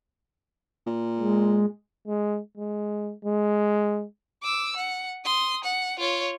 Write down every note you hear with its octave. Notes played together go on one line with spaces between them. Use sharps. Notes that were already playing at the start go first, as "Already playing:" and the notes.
A#2
G#3
G#3
G#3
G#3
D6 E6
F#5
C6 D#6
F#5
F4 C#5